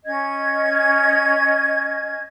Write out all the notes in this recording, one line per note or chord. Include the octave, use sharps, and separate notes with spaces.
C#4 D#5 G#6